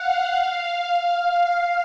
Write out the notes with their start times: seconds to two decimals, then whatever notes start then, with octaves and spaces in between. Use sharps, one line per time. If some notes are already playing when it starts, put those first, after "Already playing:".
Already playing: F5 F#5
0.36 F5